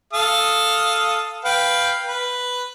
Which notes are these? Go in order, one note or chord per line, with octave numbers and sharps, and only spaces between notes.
A4 F5 D#6
B4 F5 G5
B4